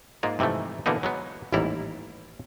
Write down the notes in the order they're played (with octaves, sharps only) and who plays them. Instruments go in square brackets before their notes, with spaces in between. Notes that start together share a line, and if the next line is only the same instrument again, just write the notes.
[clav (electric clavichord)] G#2 G#3 A#3 F4
G#2 C3 E3 F3 A3
B2 D3 E3 A#3 B3 D#4
F#3 G#3 B3
A1 D#2 G#2 G3 E4 A#5